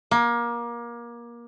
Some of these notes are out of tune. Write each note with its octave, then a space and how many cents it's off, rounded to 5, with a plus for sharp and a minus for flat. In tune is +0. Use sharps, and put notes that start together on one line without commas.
A#3 +25